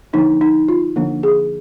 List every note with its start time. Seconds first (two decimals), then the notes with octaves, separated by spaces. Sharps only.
0.13 D3 F3 A#3 D4 D#4
0.41 D#4
0.68 F4
0.96 D3 F3 A#3 D4
1.23 G#4